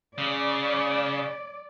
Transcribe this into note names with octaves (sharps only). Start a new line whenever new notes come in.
C#3 D5